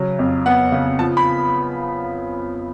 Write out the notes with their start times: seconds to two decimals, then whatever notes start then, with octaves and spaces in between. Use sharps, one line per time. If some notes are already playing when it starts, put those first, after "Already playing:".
Already playing: C#3 F#3
0.19 F2
0.46 B3 F#5
0.72 C#3
0.99 F3 A5
1.17 B5